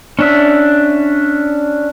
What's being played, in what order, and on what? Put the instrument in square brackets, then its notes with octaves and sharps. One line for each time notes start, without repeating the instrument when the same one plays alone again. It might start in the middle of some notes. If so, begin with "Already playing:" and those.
[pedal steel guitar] C#4 D4 E5